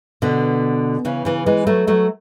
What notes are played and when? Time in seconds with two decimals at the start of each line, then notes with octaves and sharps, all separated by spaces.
0.22 B2 D3
1.05 C#3 E3
1.25 C#3 E3
1.46 E3 G#3
1.67 F#3 A3
1.87 F#3 A3